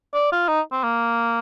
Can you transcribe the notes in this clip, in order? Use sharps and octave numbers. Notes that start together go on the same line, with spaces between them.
D5
F4
D#4
C4
A#3